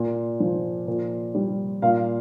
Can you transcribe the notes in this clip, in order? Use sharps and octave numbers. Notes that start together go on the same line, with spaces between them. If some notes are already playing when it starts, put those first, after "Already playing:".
Already playing: A#2
F3
A#2
G3
A#2 F5